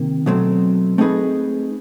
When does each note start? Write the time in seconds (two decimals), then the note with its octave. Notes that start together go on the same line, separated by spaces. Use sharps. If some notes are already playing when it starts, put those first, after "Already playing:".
Already playing: C3 D#3 A#3
0.26 B2 F#3 A3 C4
0.98 A3 C4 D#4 G#4 B4